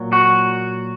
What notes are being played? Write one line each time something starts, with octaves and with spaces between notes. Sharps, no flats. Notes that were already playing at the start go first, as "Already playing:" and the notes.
Already playing: A#2 F#3
F#4